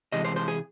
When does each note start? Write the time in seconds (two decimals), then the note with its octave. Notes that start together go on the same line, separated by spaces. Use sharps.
0.12 C3 E3 G#3 D#5
0.25 C5
0.36 C5
0.48 G#4